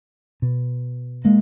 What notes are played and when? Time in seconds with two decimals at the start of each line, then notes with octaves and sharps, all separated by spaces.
0.42 B2
1.25 G#3 A#3